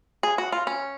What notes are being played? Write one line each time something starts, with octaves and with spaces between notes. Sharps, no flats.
G#4
F#4
F4
C#4